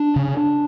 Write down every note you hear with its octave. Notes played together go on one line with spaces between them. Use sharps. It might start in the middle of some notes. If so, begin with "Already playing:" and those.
Already playing: D4
C#3